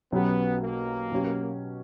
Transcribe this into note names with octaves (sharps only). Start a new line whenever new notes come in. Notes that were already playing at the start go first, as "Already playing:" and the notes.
B1 B2 F#3 B3 C#4 G4
A#3
B2 F#3 C#4 G4